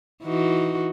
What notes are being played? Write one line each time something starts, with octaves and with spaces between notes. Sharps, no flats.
E3 D#4 F#4